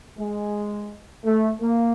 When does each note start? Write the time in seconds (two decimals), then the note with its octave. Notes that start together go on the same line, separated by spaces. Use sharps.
0.17 G#3
1.24 A3
1.60 A#3